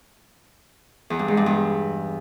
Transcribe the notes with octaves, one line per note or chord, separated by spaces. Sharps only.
E2
G2
G#2
G2
E2